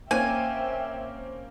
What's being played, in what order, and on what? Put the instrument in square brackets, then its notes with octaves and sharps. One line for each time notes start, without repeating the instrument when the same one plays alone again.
[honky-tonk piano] A#3 C4 C#4 [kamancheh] E5 G5 [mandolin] G#5